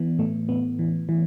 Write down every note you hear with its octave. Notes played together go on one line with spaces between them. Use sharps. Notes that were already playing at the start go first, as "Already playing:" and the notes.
Already playing: E3 B3
A2 A3
A2 B3
E3
E3